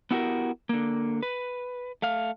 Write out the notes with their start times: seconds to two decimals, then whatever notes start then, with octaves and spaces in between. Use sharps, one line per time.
0.11 B3 E4 F#4 G4 A#4
0.69 D3 A#3
1.23 B4
2.02 A3 F5